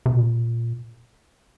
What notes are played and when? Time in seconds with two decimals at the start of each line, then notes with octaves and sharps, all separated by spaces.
0.06 C3
0.14 A#2